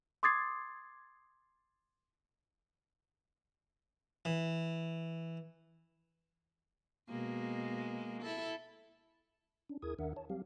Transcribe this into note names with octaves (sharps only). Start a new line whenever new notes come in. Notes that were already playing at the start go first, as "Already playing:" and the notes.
C6 D6 D#6 G#6 A6 C7
E3
B2 G#3 A#3
E4 A4
C#4 D4
D#2 E4 G#4 A#4 D#6 G#6
D#2 D#3 D4 A#4 E5 F#5
C#5 A5
F#3 G3 C4 G4 F5